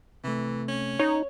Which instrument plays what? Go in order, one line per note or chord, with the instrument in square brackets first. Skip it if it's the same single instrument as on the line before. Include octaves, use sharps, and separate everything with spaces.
[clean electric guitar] C3 A3 [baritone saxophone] E3
[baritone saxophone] C#4
[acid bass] D#4 [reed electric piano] C#5